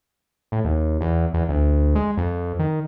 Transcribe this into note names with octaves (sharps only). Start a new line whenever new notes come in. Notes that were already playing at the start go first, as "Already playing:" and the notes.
A2
D#2
E2
E2
D2
G#3
F2
D#3